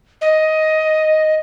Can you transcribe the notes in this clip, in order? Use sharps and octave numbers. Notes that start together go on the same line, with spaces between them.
D#5